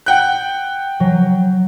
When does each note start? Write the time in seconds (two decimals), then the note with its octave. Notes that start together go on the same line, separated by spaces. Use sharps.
0.06 F#5 G5 F#6
1.00 F#3